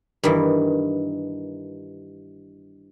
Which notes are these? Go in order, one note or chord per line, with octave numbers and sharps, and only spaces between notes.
G2 D#3 E3